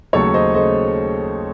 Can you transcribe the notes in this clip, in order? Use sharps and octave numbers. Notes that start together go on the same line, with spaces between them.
D#2 C#3 F#3 A3 A4 C#5
C5 D#5
C#3 F#3 A3 C5 D#5